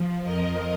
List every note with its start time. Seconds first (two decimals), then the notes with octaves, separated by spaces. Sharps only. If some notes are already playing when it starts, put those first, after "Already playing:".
Already playing: F3
0.23 F2 F3 A#4 D#5